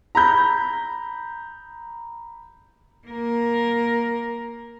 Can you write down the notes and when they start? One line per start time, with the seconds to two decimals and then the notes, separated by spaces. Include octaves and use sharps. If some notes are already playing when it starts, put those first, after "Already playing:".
0.15 A#5 B5 G6
3.07 A#3 A#4